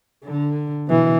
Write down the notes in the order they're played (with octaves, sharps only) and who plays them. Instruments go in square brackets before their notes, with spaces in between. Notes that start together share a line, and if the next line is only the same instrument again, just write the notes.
[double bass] D3
B2 E3